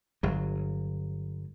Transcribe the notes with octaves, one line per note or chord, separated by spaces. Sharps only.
G1 F#3